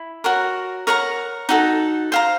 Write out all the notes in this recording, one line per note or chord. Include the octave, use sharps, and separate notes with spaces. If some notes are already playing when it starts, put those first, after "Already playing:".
Already playing: E4
F#4 A#4 C#5
A#4 C#5 F#5 A#5
D#4 F#4 A4
C5 F5 A#5